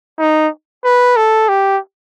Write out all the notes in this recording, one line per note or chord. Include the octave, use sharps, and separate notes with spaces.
D#4
B4
A4
G4